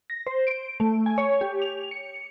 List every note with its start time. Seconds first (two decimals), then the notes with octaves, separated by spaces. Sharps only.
0.10 A#6
0.27 C5
0.47 D7
0.80 A3
1.06 G#5
1.18 C#5
1.41 G4
1.62 F7
1.91 C#7